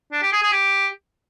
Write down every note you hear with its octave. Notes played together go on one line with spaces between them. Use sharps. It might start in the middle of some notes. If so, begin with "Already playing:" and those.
D4
G4
G#4
G#4
G4